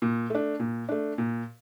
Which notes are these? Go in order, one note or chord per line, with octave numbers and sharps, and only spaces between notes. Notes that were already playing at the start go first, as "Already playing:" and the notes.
A#2
A3 D4
A#2
A3 D4
A#2